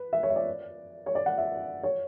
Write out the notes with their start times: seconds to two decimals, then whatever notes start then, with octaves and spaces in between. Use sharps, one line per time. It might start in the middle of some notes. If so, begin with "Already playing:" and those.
Already playing: B4
0.13 E5
0.23 C#5
0.30 E5
0.36 D5
1.06 C#5
1.15 D5
1.26 F#5
1.38 E5
1.83 C#5